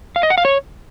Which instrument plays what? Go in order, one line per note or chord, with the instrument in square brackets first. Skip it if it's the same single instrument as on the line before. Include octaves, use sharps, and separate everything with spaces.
[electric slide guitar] F5
D#5
F#5
F5
C#5